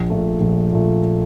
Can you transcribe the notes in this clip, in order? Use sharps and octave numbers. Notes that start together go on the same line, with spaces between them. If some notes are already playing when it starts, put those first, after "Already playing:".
Already playing: A#1
A#2 A3
A#1
A#2 A3